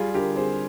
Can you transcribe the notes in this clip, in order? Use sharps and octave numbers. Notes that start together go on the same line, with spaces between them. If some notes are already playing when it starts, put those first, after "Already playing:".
Already playing: G3 F4 G#4
D3 G4 A#4
C4 G#4 C5